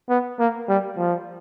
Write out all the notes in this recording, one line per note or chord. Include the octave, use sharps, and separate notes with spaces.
B3
A#3
G3
F3